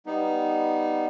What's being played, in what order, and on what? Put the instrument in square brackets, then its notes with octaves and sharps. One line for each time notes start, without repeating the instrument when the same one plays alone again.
[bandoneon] G3 B3 D#4